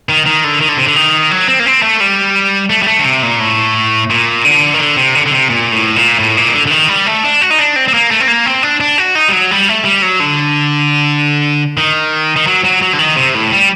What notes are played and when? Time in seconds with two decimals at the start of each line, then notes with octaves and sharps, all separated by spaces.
0.09 D#3
0.26 D#3
0.44 D3
0.61 D#3
0.69 D3
0.77 C3
0.85 D3
0.96 D#3
1.31 F#3
1.48 C4
1.60 A#3
1.66 C4
1.82 A3
2.00 G3
2.70 A3
2.82 G3
2.87 A3
2.99 D3
3.05 C3
3.23 A#2
3.40 A2
4.10 A#2
4.45 D3
4.74 D#3
4.79 D3
4.97 C3
5.15 D3
5.26 D3
5.32 C3
5.50 A#2
5.72 A2
5.96 A#2
6.19 A2
6.37 A#2
6.48 D#3
6.53 D3
6.66 D3
6.71 D#3
6.88 G3
7.07 A3
7.24 D4
7.41 F#4
7.50 D#4
7.59 D4
7.76 C4
7.88 C4
7.94 A#3
8.11 A3
8.20 C4
8.28 A#3
8.46 C4
8.63 D4
8.80 D4
8.98 F#4
9.15 D#4
9.28 G3
9.33 F#3
9.51 G3
9.68 A3
9.85 G3
10.02 F#3
10.20 D3
11.77 D#3
12.36 D#3
12.47 F#3
12.64 F#3
12.82 F#3
12.93 D3
12.99 D#3
13.16 C3
13.35 A2
13.52 G3